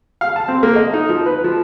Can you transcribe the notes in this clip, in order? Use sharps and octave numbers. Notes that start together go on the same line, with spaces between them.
F5
A5
C4
A#3
D#5
D#4
F3
B4
F3